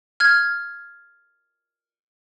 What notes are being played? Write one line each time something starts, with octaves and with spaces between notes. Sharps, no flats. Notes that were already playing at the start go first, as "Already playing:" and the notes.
F6 G#6